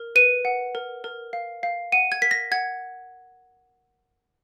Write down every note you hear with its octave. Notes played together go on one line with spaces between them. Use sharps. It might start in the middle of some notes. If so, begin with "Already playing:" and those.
Already playing: A#4
B4 D#7
F#5
A#4
A#4
F5
F5
F#5 D#7
G#6
A#4 B6
A#6
F#5 G#6